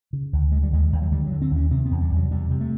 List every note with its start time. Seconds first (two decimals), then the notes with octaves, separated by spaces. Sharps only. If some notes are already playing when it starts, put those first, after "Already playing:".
0.13 C#3
0.33 D2
0.52 D3 G#3
0.63 G3
0.72 D#2 G#3
0.92 D#2
1.02 F#3
1.12 D3 G3
1.26 F#3
1.32 D3
1.42 C4
1.51 D#2
1.56 C#4
1.71 C3 C4
1.86 B3
1.91 E2
2.01 G3
2.11 E2
2.16 F#3
2.31 C3 G3
2.50 C3
2.60 A3